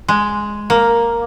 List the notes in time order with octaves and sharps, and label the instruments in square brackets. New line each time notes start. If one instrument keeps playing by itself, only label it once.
[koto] G#3
A#3